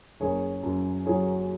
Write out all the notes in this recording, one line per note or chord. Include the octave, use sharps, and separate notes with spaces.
F#1 G#4 C#5
F#2
F#3 G#4 C#5